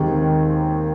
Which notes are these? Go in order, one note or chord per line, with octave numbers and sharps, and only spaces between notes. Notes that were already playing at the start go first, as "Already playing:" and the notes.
Already playing: D#2 D#3 G#3 C4 G4